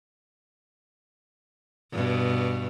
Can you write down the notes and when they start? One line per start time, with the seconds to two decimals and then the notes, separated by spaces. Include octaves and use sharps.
1.92 G2 B2